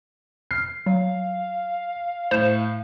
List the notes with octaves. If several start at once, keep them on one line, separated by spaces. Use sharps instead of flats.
F6 C7
F#3 F5
A2 C5 E7